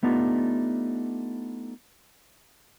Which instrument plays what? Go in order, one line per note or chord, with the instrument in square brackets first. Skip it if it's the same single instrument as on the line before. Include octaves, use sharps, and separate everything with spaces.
[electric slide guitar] A3 B3 D4 D#4 F4 G4